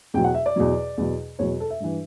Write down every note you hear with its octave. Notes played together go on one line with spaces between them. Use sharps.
E2 B2 F#3 G5
F#5
E5
D5
E2 B2 F#3
E2 B2 F#3
E2 B2 F#3 C#5
A4
E5
G2 E3